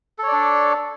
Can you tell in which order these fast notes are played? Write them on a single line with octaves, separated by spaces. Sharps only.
A4 C#5 D5 D4